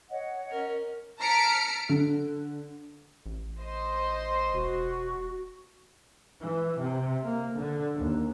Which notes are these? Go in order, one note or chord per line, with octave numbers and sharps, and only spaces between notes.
C#5 D#5 F#5
C#4 A#4
A5 A#5 F6 B6 C#7 D7
D3
A1
C5 D#5 C6
E1 F#4
E3
C3
A#3
D3
D#2